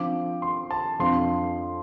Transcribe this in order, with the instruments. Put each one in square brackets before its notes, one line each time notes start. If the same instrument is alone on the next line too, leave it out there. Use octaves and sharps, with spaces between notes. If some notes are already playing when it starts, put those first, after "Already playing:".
Already playing: [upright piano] D3 F3 C4 [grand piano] D6
[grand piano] C6
A5
[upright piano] F2 D3 F3 C4 [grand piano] C6